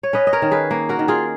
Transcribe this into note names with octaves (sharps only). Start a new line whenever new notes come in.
C#5
C#4 B4 D#5
D#5
A#4 C#5
D#3
G#4 B4
A#3
F#4 A#4
D#3
F4 G#4